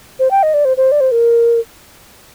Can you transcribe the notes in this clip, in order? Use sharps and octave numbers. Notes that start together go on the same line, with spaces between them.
C5
G5
D#5
D5
C5
C5
D5
C5
A#4